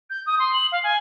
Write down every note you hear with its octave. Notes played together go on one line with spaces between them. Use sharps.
G6
D#6
C6
F#7
F5
G#5